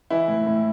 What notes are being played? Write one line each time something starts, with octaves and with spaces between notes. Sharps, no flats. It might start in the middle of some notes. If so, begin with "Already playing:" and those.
E3 E4
A2
A2